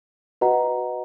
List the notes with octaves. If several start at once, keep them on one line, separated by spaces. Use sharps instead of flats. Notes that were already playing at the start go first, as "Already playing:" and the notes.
F#4 B4 D#5 F#5 A#5